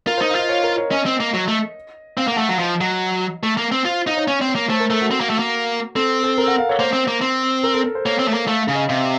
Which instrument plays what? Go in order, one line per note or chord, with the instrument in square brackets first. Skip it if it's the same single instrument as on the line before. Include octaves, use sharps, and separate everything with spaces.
[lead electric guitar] F4 [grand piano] A#4
[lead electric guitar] D#4 [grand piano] C5
[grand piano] F5
[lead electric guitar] F4 [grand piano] D#5
[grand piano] C#5
A#4
C#5
[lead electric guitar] C#4 [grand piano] D#5
[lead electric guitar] C4
A#3
F#3
A3
[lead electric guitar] C4 [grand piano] F5
[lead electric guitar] A#3 [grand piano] F#5
[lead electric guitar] A3
[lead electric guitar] F#3 [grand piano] F5
[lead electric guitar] F3 [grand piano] D#5
[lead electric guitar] F#3 [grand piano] D#5
[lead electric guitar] A3
A#3
C4
[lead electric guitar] F4 [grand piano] C5
[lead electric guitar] D#4 [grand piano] F5
[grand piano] C#5
[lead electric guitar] C#4 [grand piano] C#5
[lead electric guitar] C4
[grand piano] C#5
[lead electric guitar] A#3
[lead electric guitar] A3 [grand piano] C5
[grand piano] A#4
[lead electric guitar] A3 [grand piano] A4
[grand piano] F#4
[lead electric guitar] C4
A#3
A3
A#3
[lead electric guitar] C4 [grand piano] A4
[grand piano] A4
A#4
F#5
F5
C#5
[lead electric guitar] A#3 [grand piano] C5
[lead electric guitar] C4
A#3
C4
[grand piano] A#4
A4
A#4
C5
[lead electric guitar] A#3 [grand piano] C#5
[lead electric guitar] C4
A3
A#3
[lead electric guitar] A3 [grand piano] F5
[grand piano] F5
[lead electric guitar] C#3
[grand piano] D#5
[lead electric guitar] C3 [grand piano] F5